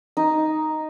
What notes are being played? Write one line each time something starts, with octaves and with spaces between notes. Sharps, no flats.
D#4